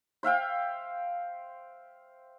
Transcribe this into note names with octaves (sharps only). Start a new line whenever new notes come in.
C5 E5 F5 G5